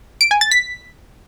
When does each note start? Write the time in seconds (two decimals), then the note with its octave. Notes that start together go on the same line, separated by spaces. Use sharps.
0.21 D7
0.31 G#5
0.41 A6
0.51 B6